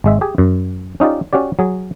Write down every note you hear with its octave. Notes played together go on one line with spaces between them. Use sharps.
G#1 G#3 E5
G4 G#4 G#5
F#2
C#4 D#4 F4 G4 D5
C#4 F#4 G4 D5
F#3 G#4